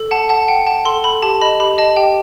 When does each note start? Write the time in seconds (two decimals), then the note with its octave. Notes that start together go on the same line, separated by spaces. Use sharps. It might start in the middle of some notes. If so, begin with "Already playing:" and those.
Already playing: A4
0.11 F#5 A5
0.29 F#5 A5
0.48 F#5 G5
0.67 F#5 A5
0.85 A4 C6
1.04 A4 B5
1.22 G4 A5
1.41 D#5 B5
1.60 G4 B5
1.78 D#5 A5
1.96 G4 G5